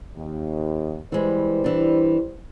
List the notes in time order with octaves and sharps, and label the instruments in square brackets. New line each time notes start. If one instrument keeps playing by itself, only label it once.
[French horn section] D#2
[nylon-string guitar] E3 G#3 [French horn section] G3 B4 C5
[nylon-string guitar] E3 D4